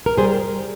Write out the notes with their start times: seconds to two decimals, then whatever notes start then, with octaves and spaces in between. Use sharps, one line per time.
0.06 A#4
0.17 G3 G#4 C5